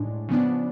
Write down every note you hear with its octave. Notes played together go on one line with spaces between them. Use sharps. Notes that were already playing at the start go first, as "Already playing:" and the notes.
Already playing: A2 G#3 D4
C#3 F3 B3 D4